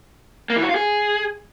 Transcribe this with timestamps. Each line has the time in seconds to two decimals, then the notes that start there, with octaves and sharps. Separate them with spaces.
0.50 A#3
0.56 E3
0.63 F#4
0.69 F4
0.76 G#4